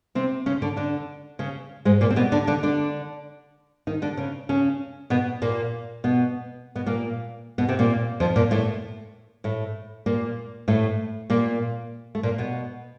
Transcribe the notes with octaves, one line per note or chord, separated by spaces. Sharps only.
C3 C4
C#3 C#4
D3 D4
D3 D4
C#3 C#4
G#2 G#3
A#2 A#3
C4
B2 B3
D3 D4
D3 D4
D3 D4
D#3 D#4
D3 D4
C#3 C#4
C#3 C#4
B2 B3
A#2 A#3
B2 B3
B2 B3
A#2 A#3
B2 B3
C3 C4
A#2 A#3
F2 F3
A#2 A#3
A2 A3
A2 A3
A#2 A#3
A2 A3
A#2 A#3
A3
A#2 A#3
B2 B3